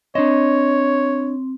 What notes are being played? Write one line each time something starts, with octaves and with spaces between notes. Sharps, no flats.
C4 D4 C#5 D#5